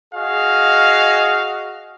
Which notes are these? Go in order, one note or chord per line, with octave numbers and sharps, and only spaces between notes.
F#4 G#4 D#5 F5